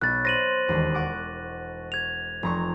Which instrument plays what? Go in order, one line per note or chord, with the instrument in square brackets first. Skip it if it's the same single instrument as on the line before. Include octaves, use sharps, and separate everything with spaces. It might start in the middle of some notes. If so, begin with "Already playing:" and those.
[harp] B1 [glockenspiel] F#6 A6
[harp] C5 [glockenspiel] A#6 D#7 F#7
[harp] E1 D#2 C#7
F#5 C#6 D6
[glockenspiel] G#6 F7
[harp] F1 A#5 C#6